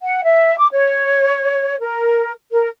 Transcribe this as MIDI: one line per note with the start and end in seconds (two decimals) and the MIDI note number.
0.02 0.20 78
0.23 0.56 76
0.57 0.67 86
0.73 1.80 73
1.80 2.31 70
2.50 2.67 70